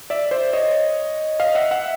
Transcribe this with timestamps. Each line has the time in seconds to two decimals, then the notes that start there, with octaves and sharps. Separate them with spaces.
0.10 D5 E5
0.31 C5 D5
0.53 C#5 D#5
1.40 D#5 F5
1.55 E5 F#5
1.71 E5 F#5